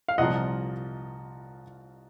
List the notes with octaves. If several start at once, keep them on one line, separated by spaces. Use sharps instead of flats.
F5
C2 A#2 F3 D#5 F#5